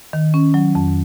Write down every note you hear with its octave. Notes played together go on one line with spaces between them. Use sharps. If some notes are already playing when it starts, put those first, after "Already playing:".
D#3
C#4
F#3
F2